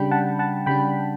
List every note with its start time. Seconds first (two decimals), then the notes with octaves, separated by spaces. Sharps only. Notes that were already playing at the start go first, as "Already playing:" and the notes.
Already playing: C#3 G3 D4 G5 B5
0.11 F#5 A5
0.39 F#5 A5
0.66 C#3 G3 D4 G5 B5